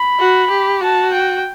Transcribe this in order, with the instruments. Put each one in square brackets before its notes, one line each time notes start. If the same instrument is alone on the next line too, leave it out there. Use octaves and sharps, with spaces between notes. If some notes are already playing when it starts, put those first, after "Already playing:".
Already playing: [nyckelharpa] B5
[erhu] F#4
G4
[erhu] F#4 [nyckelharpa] A5
[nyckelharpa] G5